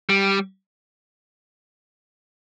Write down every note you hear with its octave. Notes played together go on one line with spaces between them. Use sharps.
G3